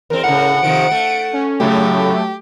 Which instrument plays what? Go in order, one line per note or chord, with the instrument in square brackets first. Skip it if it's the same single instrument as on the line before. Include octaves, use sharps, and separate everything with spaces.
[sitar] E2 C4 [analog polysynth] A#4
[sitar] A2 C#3 [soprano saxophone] F#5
[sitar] C3 D#3 F3 [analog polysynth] D7
[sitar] A3
[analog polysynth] C#4
[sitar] A2 C#3 [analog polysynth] F#3 A3 [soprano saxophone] G4